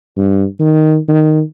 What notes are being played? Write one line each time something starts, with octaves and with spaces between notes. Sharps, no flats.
G2
D#3
D#3